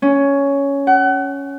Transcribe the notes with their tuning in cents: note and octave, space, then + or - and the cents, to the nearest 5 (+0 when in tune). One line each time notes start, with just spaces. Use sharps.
C#4 +10
F#5 +35